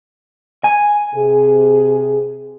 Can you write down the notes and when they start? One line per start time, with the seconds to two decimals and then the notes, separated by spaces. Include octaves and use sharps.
0.64 G#5
1.14 C3 G#4